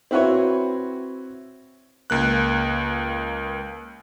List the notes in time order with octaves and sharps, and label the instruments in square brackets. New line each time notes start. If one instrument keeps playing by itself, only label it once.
[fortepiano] C4 E4 F#4 B4 C#5
[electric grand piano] C#2 A#3 F#6